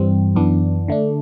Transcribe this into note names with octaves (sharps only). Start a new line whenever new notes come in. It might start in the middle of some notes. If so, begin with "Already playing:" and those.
Already playing: G2 E3 G3 C4
F#2 E3 B3 D4
D3 A3 D4